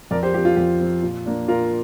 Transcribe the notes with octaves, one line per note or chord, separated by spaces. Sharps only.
F2 A#4 D5
G4 C5
F3 C4 G4
F4
F2 G4
F3 C4
A#2
A#3 D4
A#2 F4 A#4